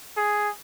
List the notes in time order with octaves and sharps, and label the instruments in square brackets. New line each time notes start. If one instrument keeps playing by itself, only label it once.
[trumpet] G#4